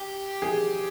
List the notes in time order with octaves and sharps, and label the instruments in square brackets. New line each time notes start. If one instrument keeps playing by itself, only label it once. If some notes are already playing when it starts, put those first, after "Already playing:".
Already playing: [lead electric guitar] G4
[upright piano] G#4